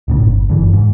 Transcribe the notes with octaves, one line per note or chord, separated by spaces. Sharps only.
D1 A2 C#3
G1
F#1 G2 D3 E3
G#2